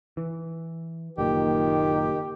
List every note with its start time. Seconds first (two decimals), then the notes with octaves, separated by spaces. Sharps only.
0.17 E3
1.18 F#1 A#2 D#3 G4